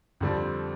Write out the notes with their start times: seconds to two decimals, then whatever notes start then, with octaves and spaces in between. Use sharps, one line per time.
0.21 F2 D3 G3 C4